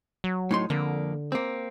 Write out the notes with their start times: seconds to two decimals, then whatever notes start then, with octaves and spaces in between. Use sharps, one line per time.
0.24 F#3
0.51 A2 D#4 C6
0.70 F2 D3 A#3
1.32 A#3 C4